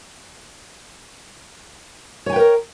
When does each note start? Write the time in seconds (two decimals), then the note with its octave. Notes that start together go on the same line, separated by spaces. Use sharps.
2.26 C#5
2.29 G#5
2.33 G5
2.36 B4
2.39 A#4